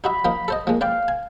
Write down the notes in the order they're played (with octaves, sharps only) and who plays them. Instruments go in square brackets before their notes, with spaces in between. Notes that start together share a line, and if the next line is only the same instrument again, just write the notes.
[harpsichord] D#4 F#4 E5 [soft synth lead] B5
[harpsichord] F3 A#3 D#4
A4 C5 D#5
[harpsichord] F3 G#3 [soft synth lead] A#3
[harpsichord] B4 D5 G5 [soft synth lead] F5
[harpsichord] G#5